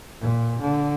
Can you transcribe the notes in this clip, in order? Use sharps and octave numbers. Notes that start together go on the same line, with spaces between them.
A#2
D3